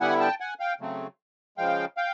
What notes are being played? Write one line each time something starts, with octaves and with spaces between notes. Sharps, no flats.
D3 G3 B3 E4 F#5 G#5
G5 A5
F#5 G#5
F5 G5
C#3 F#3 A3 C4
C#3 F3 G#3 F5 G5
F5 G5